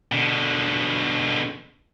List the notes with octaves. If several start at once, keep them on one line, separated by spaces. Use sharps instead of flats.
B2 D3